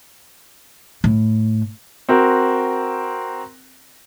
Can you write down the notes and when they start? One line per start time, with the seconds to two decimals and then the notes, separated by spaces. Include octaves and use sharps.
1.04 A2
2.09 C4 F#4 A#4